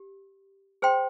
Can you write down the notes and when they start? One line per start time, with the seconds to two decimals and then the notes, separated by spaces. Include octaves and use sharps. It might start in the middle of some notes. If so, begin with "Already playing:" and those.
Already playing: G4
0.82 G#4 C5 G5 C6